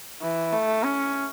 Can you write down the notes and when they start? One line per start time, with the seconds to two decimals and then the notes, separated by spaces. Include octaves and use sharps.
0.22 E3
0.52 A3
0.83 C#4